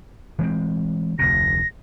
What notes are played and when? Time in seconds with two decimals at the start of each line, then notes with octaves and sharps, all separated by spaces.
0.39 E3 G#3 C4
1.19 F1 D2 C3 A#6